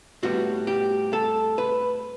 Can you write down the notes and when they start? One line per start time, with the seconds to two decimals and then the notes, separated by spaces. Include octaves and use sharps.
0.23 A2 G3 B3 F#4
0.67 G4
1.13 A4
1.58 B4